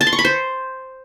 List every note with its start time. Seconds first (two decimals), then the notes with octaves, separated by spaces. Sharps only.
0.01 A5
0.07 C6
0.13 C#6
0.19 B5
0.25 C5